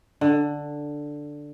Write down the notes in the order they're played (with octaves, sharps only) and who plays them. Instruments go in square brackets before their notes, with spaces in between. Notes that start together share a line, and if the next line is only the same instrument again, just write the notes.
[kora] D3